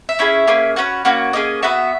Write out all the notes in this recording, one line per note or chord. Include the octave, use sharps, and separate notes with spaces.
E5
C#4 E4 G#4
A#3 C#4 G#4
C#4 F#4 B4
A#3 C#4 F#4
A#3 C#4 G#4 D#5
B3 F#4 E5